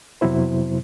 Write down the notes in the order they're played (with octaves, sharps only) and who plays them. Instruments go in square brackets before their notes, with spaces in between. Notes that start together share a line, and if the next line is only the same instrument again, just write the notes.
[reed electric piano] F2 C3 F#3 B3 E4 C5